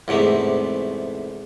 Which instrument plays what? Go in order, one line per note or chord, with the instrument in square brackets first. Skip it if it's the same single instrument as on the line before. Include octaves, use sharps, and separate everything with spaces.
[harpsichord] E2 G#2 C3 A3